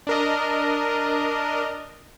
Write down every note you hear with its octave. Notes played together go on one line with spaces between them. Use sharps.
D4 A#4 D#5